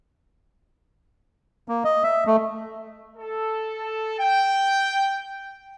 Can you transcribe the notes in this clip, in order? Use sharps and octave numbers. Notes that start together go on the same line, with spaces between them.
A#3
D#5
E5
A3
A4
G5